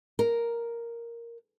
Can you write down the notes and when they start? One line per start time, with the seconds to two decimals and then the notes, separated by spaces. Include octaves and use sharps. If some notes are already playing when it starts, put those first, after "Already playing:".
0.19 A#4